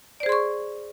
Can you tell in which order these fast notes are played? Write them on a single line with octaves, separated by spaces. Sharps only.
D5 C5 G#4 C6 C#6